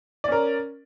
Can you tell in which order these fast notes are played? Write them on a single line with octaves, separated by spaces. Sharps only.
D5 C#4 A#4